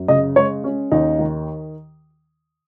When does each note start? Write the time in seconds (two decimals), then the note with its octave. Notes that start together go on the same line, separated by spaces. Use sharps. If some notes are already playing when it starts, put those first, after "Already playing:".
Already playing: F#2
0.08 C#3 D#5
0.36 G#3 C#5
0.64 C#4
0.92 D#2 D#4
1.19 D#3